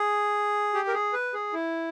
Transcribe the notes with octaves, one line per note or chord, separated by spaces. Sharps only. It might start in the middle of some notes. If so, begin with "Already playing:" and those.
Already playing: G#4
G4
A#4
G#4
B4
G#4
E4